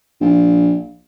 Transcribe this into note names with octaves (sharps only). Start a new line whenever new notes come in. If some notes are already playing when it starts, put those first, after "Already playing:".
A#1